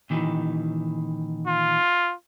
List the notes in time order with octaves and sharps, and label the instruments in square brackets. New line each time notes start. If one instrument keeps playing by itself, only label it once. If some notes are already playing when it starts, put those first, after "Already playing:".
[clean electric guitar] A#2 D#3 E3
[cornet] F4